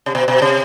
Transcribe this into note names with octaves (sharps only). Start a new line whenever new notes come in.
C3
B2
B2
C3